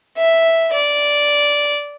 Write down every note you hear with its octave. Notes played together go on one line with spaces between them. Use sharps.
E5
D5